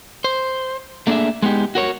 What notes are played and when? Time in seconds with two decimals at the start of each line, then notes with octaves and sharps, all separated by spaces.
0.24 C5
1.07 A3 A#3 D4 G4 G#4 E5
1.42 G#3 B3 D#4 G4
1.75 F#4 A#4 C#5